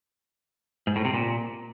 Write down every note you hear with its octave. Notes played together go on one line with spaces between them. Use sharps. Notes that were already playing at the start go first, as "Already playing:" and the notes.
G#2
A2
C3
A#2